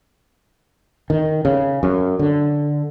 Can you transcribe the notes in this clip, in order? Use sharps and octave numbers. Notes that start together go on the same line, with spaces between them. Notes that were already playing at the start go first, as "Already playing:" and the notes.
D#3
C#3
F#2
D3